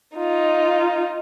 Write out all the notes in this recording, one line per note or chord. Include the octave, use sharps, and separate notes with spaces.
D#4 F4